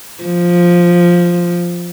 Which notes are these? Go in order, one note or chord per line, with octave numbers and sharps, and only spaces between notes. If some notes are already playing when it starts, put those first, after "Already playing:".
F3